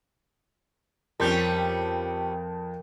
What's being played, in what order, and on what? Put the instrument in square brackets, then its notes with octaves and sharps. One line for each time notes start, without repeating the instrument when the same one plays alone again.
[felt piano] F2 C6 [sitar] G3 C4 C#4 [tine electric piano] A#4 G6